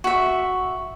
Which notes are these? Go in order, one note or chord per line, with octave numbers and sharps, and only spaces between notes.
F#4 E5